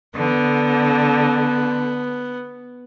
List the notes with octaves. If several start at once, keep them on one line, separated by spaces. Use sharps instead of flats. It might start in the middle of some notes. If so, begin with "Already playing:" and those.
D3 B3